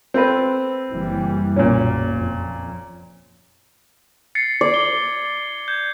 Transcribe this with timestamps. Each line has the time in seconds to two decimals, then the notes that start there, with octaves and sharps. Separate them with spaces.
0.14 C4 A4 B4
0.91 F#1 E3 G3
1.56 F#1 B1 A#2 C#4
2.17 F2
4.35 A6 C7 C#7
4.61 D5 G#6
4.74 G7
5.68 G6 G#6